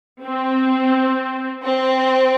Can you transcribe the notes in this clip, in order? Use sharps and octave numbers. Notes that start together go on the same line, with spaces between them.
C4
C4